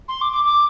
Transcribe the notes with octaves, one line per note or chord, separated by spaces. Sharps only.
C6
D6
D6
D6